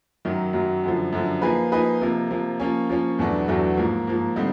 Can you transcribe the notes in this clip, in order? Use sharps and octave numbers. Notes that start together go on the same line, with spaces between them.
F#2 D#3 F#3
F#2 D#3 F#3
F#2 D3 F3
F#2 D3 F3
F3 A#3 D#4 G#4 B4
F3 A#3 D#4 G#4 B4
C3 F3 A#3
C3 F3 A#3
F3 A#3 C#4
F3 A#3 C#4
E2 B2 F#3 A3 D4
E2 B2 F#3 A3 D4
G#2 F3 A#3
G#2 F3 A#3
D3 G3 C4 D#4